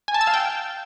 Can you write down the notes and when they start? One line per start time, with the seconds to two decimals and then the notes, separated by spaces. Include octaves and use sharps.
0.08 G#5
0.14 A5
0.21 E6
0.27 F5
0.34 G5